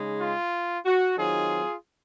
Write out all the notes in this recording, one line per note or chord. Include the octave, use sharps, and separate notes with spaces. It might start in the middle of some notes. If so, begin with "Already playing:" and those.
Already playing: C#3 G#3 D#4
F4
F#4
D#3 F#3 C4 D#4 F4 G#4